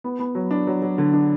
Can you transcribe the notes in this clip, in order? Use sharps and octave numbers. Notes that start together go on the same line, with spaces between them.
B3
B3
F#3
D4
F#3
F#3
D3
D4